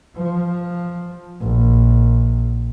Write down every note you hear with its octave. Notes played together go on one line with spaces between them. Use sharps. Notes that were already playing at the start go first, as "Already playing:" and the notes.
F3
A#1